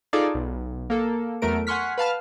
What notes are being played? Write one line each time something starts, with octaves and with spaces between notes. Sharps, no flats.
D#4 F4 G#4 A4 D5
B1
A#3 A4
E2 F#3 A3 A#4 D7
F#5 G#5 C6 C#6 F6 B6
B4 F5 A5 F6